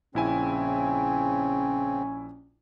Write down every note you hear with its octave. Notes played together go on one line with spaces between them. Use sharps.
A#1 C#3 C4 C#4 E4 G#5